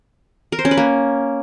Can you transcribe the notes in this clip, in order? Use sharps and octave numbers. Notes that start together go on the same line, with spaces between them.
A#4
C5
C#4
B4
A#3